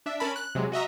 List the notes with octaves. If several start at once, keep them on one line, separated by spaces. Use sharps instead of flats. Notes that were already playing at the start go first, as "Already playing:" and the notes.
D4 E5
C#4 A#4 A5 B5
F#6
C3 F#3 G#3
F#4 D#5 E5 A#5